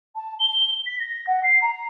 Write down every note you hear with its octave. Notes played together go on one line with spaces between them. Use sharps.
A5
G7
B6
A#6
F#5
C7
A#5